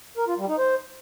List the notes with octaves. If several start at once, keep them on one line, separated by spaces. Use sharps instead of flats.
A#4
F4
G3
D#4
C5